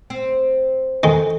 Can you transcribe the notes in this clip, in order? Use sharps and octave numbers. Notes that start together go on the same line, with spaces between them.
C4
D#3 G#3 A4